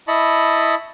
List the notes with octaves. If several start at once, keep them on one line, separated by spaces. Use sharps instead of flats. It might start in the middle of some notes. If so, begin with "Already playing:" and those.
E4 D#5 A5 B5 C#6